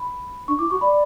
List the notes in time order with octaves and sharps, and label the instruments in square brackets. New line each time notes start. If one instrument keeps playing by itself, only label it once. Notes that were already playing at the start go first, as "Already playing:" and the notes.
Already playing: [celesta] B5
[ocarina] D4 [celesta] C#6
[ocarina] E4 [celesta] D6
[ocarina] F#4 [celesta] C#6
[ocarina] D5 [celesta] B5